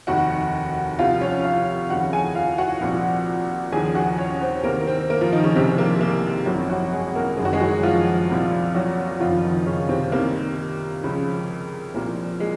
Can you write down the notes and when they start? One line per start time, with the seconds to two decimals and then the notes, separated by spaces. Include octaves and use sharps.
0.07 F1 D#2 D#3 F#4 F#5
0.99 C2 C3 F3 F4 F5
1.21 C#4 C#5
1.44 F4 F5
1.90 F1 D#2 C#3 F3 F#4 F#5
2.12 G#4 G#5
2.35 F4 F5
2.58 F#4 F#5
2.81 C2 A#2 F3
3.72 D#2 C#3 F3 G#4 G#5
3.95 F#4 F#5
4.18 C#4 C#5
4.42 C4 C5
4.63 C2 C3 D#3 A#3 A#4
4.81 A#4
4.87 C4 C5
5.10 A#3 A#4
5.21 F3 F4
5.33 D#3 D#4
5.44 C#3 C#4
5.55 A#1 G#2 C3 F3 C4
5.78 A#3
6.01 A#3
6.46 G#1 F#2 F3 F#3 F#4
6.70 F#3 F#4
6.92 G#3 G#4
7.15 A#3 A#4
7.37 F#1 F#2 D#3 G#4
7.45 F#4
7.53 G#3 G#4
7.61 F#3 F#4
7.83 F3 F4
8.30 C2 A#2 F3
8.75 F#3 F#4
9.20 F#1 F2 D#3 F3 F4
9.43 D#3 D#4
9.66 C#3 C#4
9.89 C3 C4
10.12 C2 C3 D#3 A#3
11.03 C#2 C#3 F3
11.94 C2 A#2 F3 A#3
12.40 G#3